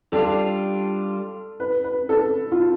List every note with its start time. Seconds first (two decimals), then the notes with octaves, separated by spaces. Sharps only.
0.12 G3 D4 F4 A4
1.60 B4
1.84 B4
2.09 A4
2.52 F4